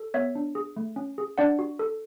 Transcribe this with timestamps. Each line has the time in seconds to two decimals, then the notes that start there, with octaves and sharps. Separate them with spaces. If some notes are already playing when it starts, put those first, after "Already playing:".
Already playing: A4
0.14 B3 C#5 E5
0.35 D4
0.55 G#4
0.77 A3
0.96 C#4
1.18 G#4
1.38 D4 D5 F#5
1.59 F#4
1.79 A4